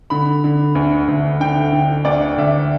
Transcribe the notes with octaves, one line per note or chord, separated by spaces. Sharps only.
D3 B5
D3
D2
D2
D3 G5
D3
D2 D5
D2 E5